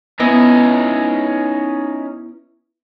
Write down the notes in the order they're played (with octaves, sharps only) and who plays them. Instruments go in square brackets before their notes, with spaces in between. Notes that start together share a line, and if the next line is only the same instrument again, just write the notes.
[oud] B3 E4 D#5 [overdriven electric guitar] C#4 D#4